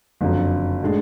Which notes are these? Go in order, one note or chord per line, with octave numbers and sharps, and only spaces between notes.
F#1 F2 D3 F#3
A2 G#3 D4